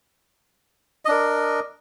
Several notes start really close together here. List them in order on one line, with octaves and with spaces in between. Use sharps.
D#5 D4 A#4